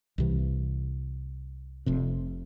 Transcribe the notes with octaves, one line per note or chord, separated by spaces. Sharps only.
C2 C3 E3
F1 F2 C3